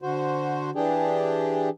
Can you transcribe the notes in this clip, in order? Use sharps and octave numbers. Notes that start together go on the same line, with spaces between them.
D3 F#4 C5
E3 D4 G4 G#4